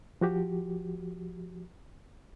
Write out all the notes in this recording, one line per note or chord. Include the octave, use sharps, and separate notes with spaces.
F3 F#4 G4